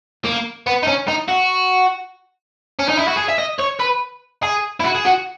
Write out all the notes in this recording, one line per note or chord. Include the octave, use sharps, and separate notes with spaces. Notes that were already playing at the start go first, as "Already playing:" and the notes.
A#3
B3
D#4
C#4
D#4
F#4
C#4
D#4
E4
F#4
G#4
E5
D#5
C#5
B4
G#4
E4
F#4
G#4
F#4